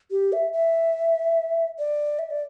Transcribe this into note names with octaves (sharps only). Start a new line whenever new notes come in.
G4
E5
E5
D5
E5
D5